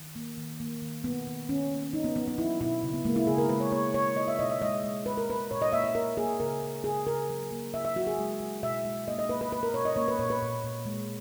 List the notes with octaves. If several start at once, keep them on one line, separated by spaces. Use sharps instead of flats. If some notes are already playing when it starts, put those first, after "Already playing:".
Already playing: D#3
A#3
D#3
A#3
D#3
A#3 B3
D#3
D#3 C#4
A#3
F#3 D#4
B3
F#3 B3
B3
F#3 E4
B2 E4
C#3
B3
G#3 A#3
E4
C#3 G#4
A#4
G#3 B4
C#5
A#3 C#5
A#3 C#5
A#3 D#5
E5
B2 D#5
E5
G#3 D#5
G#3
G#3 B4
A#4
G#3 B4
A#2 C#5
D#5
A#3 E5
D#5
A#3 A#4
A#3 G#4
C#3 A#4
C#3
C#3 G#4
C#3 A#4
F#3
A#3
C#3 E5
E5
F#3 F#4
G#4
G#3
G#3
B2 E5
G#3
A#3 D#5
D#5
A#3 B4
B4
A#3 B4
A#4
B2 C#5
D#5
A#3 C#5
B4
A#2 C#5
B4
A#2
A#2
G#3